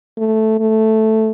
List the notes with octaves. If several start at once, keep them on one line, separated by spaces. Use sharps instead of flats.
A3
A3